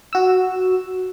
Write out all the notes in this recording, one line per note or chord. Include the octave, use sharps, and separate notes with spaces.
F#4 E6